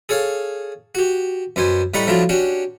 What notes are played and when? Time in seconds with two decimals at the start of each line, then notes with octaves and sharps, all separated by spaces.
0.09 G#4 A4 C#5 F5
0.95 F#4 G4
1.56 F#2 B2 B3 C5 G#5
1.94 A2 G3 D#4 F#5 B5 C#6
2.07 F3 F#3 A3 D4 E4 F4
2.29 C#4 D4 F#4 G4